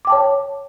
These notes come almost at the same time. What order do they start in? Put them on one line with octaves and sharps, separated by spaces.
D6 G5 A5 C#5